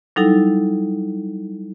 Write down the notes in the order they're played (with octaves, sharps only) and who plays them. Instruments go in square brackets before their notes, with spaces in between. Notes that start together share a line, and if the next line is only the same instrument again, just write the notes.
[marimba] F#3 G3 D#4 E4 A4